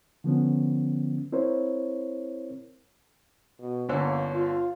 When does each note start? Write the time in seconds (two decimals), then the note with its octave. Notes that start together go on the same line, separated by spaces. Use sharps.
0.24 D3 F3 B3 C#4
1.32 C4 E4 A#4 C5 C#5
3.60 B2
3.89 G1 D3 A#3 C#4
4.32 F4